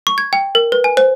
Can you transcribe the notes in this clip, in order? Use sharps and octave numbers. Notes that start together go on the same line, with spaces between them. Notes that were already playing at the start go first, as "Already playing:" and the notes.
C#6
G#6
G5
A#4
B4
G#5
C5